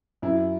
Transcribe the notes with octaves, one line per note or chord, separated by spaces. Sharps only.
F#2 E4